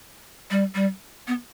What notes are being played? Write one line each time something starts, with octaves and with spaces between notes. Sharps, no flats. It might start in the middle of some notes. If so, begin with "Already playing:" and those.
G3
G3
B3